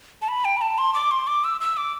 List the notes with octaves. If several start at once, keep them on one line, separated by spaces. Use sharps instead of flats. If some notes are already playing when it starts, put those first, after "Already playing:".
A5
B5
G5
B5
A5
C6
D6
C6
D6
E6
E6
D6